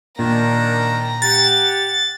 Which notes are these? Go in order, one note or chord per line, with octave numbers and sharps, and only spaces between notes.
A#2 D#3 A#3 D4 A#5
G4 F#5 A6